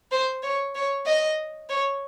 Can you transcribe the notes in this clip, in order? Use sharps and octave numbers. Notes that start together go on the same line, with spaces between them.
C5
C#5
C#5
D#5
C#5